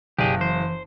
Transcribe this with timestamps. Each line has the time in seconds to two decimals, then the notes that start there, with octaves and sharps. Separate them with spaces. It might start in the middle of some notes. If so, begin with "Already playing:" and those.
0.19 F#1 B2 G4 G#4 D5
0.41 E3 C5